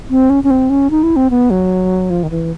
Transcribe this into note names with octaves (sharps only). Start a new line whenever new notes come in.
C4
C#4
C#4
C4
C#4
D#4
E4
C4
B3
F#3
F3
D#3
E3